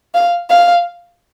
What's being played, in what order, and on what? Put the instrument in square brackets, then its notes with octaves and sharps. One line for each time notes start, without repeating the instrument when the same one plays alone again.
[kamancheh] F5
F5